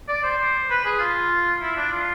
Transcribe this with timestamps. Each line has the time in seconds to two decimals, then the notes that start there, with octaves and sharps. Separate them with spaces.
0.08 D5
0.23 C5
0.70 B4
0.85 G#4
1.00 F4
1.62 E4
1.76 D4
1.92 F4